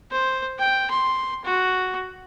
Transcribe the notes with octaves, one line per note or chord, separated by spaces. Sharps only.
C5
G5
C6
F#4